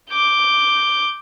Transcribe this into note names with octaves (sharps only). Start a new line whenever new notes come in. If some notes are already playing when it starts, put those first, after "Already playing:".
D6 G6